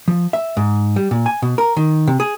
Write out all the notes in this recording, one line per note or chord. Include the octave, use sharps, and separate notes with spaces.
F3
E5
G#2
G3
A#2
G#5
B2
A#4
D#3
C3
G#4